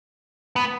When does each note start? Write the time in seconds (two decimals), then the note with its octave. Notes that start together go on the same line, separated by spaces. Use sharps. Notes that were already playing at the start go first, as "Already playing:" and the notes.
0.56 B3